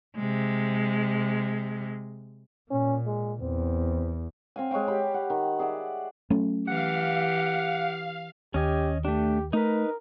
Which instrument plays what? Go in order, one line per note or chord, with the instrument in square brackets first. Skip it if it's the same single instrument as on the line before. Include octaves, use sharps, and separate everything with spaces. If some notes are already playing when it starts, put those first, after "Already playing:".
[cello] C3 G#3
[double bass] A#2 [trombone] C#4
[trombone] G#3
[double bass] E2 [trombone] C4
[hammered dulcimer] C4 F5 G#5
G#3 C#5 F5 G5
G4 F5 B5
F#5
D#3
G#4 D5 E5 F#5
[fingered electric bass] F#3 A3 C#4
[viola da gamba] E3 G4 [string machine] F5 [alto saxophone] F#5
[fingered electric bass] D#2 [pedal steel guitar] C#4 D#5 G#5 [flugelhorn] G4
[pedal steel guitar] A3 D4 [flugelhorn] G4
[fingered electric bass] A3 [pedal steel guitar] D#4 B4 [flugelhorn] A#4